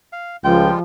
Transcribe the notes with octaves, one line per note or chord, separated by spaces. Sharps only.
F5
C#2 F3 G3 G#3 F4 G5